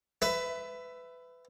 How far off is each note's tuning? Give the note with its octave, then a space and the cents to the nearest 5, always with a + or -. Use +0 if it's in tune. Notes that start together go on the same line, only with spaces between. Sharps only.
B4 +20 E5 +10